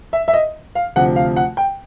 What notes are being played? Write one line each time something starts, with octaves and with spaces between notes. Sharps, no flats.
E5
E5
D#5
F5
D2 C3 F3 F#5
F5
F#5
G5